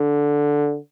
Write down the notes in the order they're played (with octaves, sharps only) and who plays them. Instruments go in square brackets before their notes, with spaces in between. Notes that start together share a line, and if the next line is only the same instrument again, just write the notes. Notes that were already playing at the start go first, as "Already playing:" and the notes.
Already playing: [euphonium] D3